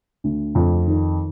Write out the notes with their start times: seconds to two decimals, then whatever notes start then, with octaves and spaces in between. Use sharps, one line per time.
0.24 D2
0.55 F2
0.87 D#3